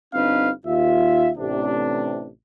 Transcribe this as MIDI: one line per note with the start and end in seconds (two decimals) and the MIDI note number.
0.13 0.50 31
0.13 0.50 60
0.13 0.50 62
0.13 0.50 63
0.13 0.50 71
0.13 0.50 77
0.65 1.30 39
0.65 1.30 65
0.65 1.30 76
1.38 2.28 33
1.38 2.28 48
1.38 2.28 62